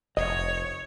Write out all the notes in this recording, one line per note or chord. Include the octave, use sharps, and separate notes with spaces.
F1 C#5 D#5